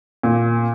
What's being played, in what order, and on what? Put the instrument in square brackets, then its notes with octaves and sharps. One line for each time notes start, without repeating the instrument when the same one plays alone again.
[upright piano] A#2